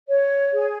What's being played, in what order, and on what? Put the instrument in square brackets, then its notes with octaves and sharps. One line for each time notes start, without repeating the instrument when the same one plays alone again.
[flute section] C#5
G#4